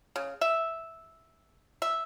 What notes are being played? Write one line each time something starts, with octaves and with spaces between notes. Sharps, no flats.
C#3
E5
E5